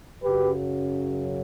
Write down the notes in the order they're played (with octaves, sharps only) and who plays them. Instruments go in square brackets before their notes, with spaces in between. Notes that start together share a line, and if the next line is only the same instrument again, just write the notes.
[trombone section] F#2 C#3 F#3 G4 B4